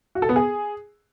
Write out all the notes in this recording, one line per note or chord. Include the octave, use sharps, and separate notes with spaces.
F#4
A4
B3
G#4